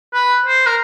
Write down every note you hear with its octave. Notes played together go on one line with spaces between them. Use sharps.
B4
C5
A#4